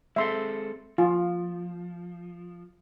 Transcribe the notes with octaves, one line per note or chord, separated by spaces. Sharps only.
G#3 C4 A4 E5 C6
F3 F4